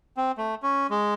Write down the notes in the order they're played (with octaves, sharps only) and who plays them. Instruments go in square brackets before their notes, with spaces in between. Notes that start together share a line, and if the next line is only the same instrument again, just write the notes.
[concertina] C4
A3
C#4
G#3